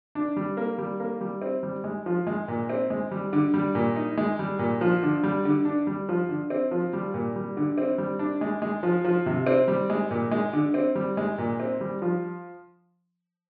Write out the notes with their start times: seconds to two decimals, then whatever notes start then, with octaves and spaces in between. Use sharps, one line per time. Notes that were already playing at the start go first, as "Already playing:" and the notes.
0.15 D4
0.37 G3
0.57 A#3
0.78 G3
1.00 A#3
1.21 G3
1.42 C4
1.63 G3
1.84 G#3
2.06 F3
2.27 G#3
2.48 A#2
2.69 C4
2.90 G#3
3.11 G3
3.33 D3
3.54 G3
3.75 A#2
3.96 D#4
4.17 G#3
4.39 G3
4.59 A#2
4.81 F3
5.03 D3
5.23 G3
5.45 D3
5.65 D4
5.87 G3
6.09 F3
6.29 D3
6.50 C4
6.71 F3
6.93 G3
7.14 A#2
7.36 G3
7.57 D3
7.78 C4
7.98 G3
8.19 D4
8.41 G#3
8.62 G#3
8.83 F3
9.04 F3
9.26 C3
9.47 C4
9.68 G3
9.90 G#3
10.11 A#2
10.31 G#3
10.53 D3
10.74 C4
10.95 G3
11.17 G#3
11.38 A#2
11.60 C4
11.81 G3
12.02 F3